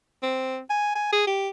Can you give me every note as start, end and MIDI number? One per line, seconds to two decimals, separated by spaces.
0.23 0.59 60
0.70 0.95 80
0.95 1.12 80
1.12 1.26 68
1.27 1.49 67